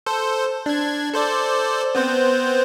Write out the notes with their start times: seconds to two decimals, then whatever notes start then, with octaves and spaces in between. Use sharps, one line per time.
0.06 A4 C5
0.66 D4 G#6
1.14 A4 C5 D5
1.95 B3 C4 C5